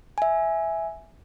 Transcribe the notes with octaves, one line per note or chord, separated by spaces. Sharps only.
E5 G#5